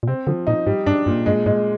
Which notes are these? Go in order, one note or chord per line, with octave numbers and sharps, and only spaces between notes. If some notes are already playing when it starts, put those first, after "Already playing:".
A#2
C3 C4
D3 F3
A#2 D#4
G#2 G3
G2 D4
G2 A#2
G2 G#3
G#2 G#3